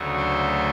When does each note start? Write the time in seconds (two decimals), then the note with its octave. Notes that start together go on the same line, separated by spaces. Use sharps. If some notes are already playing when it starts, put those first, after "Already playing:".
Already playing: D2 C#3 F#3 A3
0.17 C5